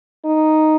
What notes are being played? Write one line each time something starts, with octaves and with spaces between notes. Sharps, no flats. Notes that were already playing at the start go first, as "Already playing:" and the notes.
D#4